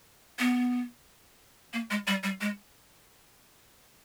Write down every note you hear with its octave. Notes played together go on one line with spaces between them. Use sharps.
B3
A#3
G#3
G3
G3
G#3